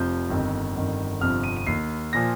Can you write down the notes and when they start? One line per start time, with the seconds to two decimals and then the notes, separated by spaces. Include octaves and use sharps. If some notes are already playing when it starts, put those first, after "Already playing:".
Already playing: F1 F2 C3 F3 G6
0.30 G1 F2 D#3
0.76 G1 F2 D#3
1.21 G1 F2 C3 F3 F6
1.44 D#7
1.57 D#7
1.67 D#2 D#3 C7
2.13 A#2 F3 A#6